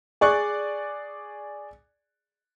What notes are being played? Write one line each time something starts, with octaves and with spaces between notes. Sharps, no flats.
G#4 D5 C#6 F#6